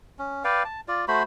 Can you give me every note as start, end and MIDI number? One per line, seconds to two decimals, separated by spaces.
0.19 0.43 61
0.44 0.63 71
0.44 0.63 74
0.44 0.63 77
0.44 0.63 79
0.65 0.81 81
0.88 1.05 65
0.88 1.05 74
1.08 1.23 57
1.08 1.23 66
1.08 1.23 72
1.08 1.23 83